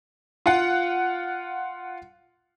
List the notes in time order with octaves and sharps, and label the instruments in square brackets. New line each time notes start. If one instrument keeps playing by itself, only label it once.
[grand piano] F4 F5 F#5